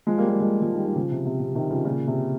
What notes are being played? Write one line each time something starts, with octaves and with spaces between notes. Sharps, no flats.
F3 G#3
G3 A#3
G3 A#3
F3 G#3
F3 G#3
D#3 G3
D#3 G3
C#3 F3
C3
C3
C3
C3 D#3
C#3 F3
A#2 C#3
C3